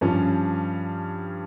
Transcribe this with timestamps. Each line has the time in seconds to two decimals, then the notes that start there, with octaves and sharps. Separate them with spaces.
0.01 G2 F3 C#4